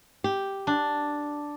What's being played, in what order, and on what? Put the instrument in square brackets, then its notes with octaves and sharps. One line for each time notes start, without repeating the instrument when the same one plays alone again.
[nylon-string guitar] G4
[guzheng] D4